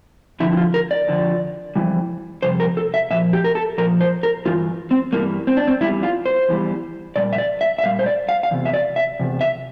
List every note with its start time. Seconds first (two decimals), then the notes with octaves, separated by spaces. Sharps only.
0.40 F2 D3 F3 E4
0.53 E4
0.57 F4
0.74 A#4
0.91 D5
1.08 F2 D3 F3
1.76 F2 C3 E3 G3
2.43 F2 C3 G3 C5
2.60 A#4
2.77 A4
2.94 E5
3.10 A#2 F3 E5
3.33 G4
3.44 A#4
3.55 A4
3.78 A#2 F3 A#4
4.01 C5
4.23 A#4
4.45 G2 E3 F4
4.91 C4
5.13 G2 E3 G3 A#3
5.47 C4
5.57 D4
5.68 C4
5.81 E2 E3 G3 E4
6.03 F4
6.26 C5
6.48 E2 E3 G3
7.16 A#2 G3 D5
7.33 E5
7.38 D5
7.61 E5
7.78 E5
7.83 A#2 G3 F5
7.99 C5
8.06 D5
8.29 F5
8.43 F5
8.51 E2 C3
8.65 E5
8.74 D5
8.96 E5
9.20 E2 C3
9.41 E5